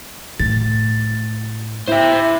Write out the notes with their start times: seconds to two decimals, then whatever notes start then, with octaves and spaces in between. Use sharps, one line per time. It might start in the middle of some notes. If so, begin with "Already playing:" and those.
0.40 A2 A6
1.88 E4 C5 E5